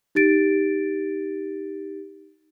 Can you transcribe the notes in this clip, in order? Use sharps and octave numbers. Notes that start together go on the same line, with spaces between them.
D#4 G4 A6 D7